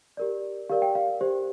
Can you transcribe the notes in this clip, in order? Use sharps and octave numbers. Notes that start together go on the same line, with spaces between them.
G4 A#4 D5
G4 A#4 D5 F5
G5
F5
G4 C5